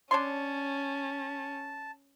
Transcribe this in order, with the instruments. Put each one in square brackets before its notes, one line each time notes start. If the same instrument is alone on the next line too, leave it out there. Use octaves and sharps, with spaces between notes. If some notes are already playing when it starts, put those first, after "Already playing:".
[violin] C#4 [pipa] D4 C#5 C6 [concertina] A5